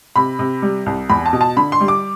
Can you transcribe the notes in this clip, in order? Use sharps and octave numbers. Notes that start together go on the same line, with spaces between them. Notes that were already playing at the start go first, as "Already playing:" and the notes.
C3 B5
C3
G3
C2
E2 B5
A5
B2
A5
D3 B5
C6
G3
D6